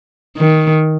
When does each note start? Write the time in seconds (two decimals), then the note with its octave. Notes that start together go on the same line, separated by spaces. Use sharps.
0.37 D#3